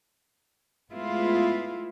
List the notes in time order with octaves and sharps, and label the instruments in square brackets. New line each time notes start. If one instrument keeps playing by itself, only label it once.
[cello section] G#3 A3 B3 E4 F4